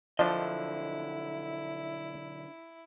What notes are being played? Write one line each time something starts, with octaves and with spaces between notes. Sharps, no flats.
B1 D3 F3 D4 E4 D#5